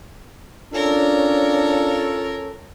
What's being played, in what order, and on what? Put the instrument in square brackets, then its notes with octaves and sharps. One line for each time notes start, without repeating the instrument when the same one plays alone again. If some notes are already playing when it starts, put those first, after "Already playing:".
[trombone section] C#4 A4 [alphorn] D4 [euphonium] F4 [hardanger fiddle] A#4 C#5